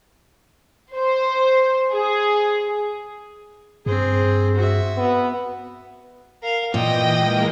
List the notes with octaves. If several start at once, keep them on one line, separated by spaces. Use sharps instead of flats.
C5
G#4
G2 C4 G#4
F#4 E5
B3
A#4 F5
A#2 E3 D#5 G5
G#3 A#3 A#4